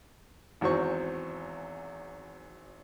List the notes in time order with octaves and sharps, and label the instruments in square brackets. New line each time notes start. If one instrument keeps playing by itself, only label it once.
[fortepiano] G#1 E2 F#3 C4 C#6